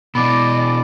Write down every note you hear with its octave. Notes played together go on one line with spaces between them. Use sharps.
B2 E3 D5 D#5 B5 D6